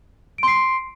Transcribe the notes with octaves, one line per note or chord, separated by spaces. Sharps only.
C6 C7 D7